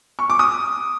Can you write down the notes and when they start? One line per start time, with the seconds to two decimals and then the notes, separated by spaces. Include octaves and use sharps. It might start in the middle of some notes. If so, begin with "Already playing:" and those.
0.19 C#6
0.30 D6
0.39 D#6